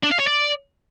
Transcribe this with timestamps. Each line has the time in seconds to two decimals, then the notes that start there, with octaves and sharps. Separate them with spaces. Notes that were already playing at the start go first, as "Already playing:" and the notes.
0.04 D4
0.12 F5
0.20 C#5
0.27 D5